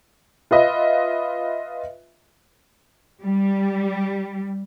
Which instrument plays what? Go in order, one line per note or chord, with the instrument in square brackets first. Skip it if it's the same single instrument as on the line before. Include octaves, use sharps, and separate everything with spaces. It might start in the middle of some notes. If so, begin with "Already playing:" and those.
[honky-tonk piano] F4 B4 D#5 E5
[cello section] G3